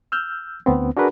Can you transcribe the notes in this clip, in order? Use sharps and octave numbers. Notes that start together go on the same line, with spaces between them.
E6 F6 G6
D2 B3 C4
D4 F#4 G#4 A#4 B4